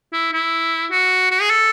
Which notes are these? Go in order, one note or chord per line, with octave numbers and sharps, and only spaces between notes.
E4
E4
F#4
F#4
G#4
A4